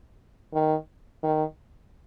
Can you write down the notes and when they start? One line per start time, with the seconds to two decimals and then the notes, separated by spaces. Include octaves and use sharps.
0.54 D#3
1.23 D#3